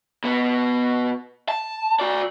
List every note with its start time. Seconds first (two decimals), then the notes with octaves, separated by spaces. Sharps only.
0.24 B2 B3
1.49 A5
2.00 F#4 D5